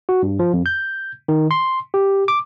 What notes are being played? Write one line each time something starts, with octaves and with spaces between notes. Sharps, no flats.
F#4
G2
F3
F2
G6
D#3
C6
G4
D6